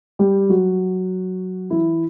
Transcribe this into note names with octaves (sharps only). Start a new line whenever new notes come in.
G3 G4
F#3 F#4
E3 E4